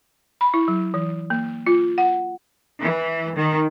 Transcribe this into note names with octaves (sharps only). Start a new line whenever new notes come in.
B5
E4
F#3
E3
A#3
F4
F#5
E3
D#3